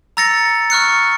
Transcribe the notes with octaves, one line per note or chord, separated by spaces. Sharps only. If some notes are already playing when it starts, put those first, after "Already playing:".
A#5 E6 A6 A#6 C#7
C#6 F6 F#6 C#7